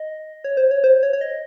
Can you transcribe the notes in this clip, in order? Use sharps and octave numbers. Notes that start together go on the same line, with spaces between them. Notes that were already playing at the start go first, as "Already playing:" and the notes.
Already playing: D#5
C#5
C5
C#5
C5
C#5
C#5
D#5